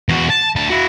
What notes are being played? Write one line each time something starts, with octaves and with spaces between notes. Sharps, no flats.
E2 F#4
A5
D2 A5
E4 F#4